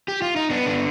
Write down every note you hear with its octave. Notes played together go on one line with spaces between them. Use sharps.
G4
F4
D#4
B3 D4
D3 D4